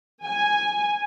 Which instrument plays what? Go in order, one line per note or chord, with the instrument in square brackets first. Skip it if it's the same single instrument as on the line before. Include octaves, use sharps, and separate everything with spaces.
[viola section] G#5